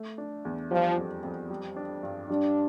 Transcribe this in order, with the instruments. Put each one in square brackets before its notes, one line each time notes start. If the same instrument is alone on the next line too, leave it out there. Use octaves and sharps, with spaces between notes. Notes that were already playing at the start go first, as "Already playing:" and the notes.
Already playing: [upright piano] A3
D4
E2
[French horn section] F3 [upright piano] G3
[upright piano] F2
F2
G3
D4
G2
[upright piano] G3 [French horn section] D4